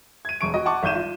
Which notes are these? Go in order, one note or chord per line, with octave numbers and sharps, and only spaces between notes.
G#6 D#7
E1 C#6 D7
F#4 D#5
F#5 A5 C#6 D6
G#1 E5 G6 D#7 E7
F4